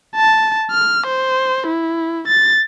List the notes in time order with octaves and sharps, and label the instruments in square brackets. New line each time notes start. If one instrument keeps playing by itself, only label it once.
[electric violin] A5
F6
C5
E4
A6